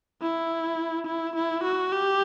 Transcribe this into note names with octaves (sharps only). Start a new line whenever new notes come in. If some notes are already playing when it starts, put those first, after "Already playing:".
E4
E4
E4
F#4
G4